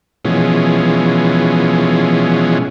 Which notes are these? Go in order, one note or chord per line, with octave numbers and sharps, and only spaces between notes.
B2 E3 F3 G#3 C#4